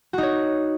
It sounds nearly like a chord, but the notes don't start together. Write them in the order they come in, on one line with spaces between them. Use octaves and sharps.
F#4 D#4 C#5